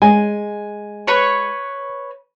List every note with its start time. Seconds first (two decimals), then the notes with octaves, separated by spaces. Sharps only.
0.02 G#3 G#5
1.08 B4 C#5 C#6